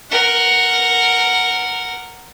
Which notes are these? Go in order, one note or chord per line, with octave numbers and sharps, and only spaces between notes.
A#4 F#5